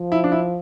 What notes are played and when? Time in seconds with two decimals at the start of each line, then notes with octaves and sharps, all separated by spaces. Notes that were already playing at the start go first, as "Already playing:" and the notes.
Already playing: F3
0.12 E4
0.24 D4
0.32 E4